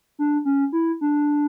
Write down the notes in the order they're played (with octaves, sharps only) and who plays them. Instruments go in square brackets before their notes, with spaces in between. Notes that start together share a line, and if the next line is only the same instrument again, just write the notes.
[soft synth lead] D4
C#4
E4
D4